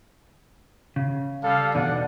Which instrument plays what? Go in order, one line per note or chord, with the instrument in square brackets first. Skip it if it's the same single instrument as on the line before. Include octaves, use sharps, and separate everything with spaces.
[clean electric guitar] C#3
[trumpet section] G3 A4 F5
[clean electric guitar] E2 B2 D#4 [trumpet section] D4 D5 F#5